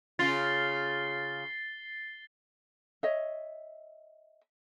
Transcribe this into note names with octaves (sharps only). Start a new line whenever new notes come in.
C#3 F4 A6 C7 G7
C#5 D#5 E5